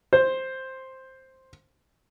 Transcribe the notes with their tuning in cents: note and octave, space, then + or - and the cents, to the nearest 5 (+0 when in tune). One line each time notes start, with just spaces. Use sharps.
C5 +5